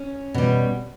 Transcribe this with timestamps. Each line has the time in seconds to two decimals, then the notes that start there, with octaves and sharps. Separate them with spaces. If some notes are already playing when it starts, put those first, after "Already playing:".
Already playing: C#4
0.34 B2 G3